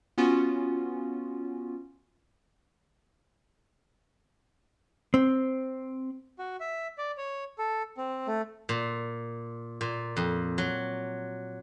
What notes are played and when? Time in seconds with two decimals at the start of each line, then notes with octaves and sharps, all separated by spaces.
0.18 B3 C#4 F4 F#4
5.14 C4
6.39 F#4
6.60 E5
6.98 D5
7.17 C#5
7.58 A4
7.97 C4
8.27 A3
8.69 A#2
9.81 A#2
10.17 F2
10.58 F#3